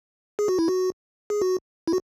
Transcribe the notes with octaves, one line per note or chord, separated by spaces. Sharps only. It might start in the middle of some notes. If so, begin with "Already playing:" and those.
G#4
F#4
E4
F#4
G#4
F#4
E4
F#4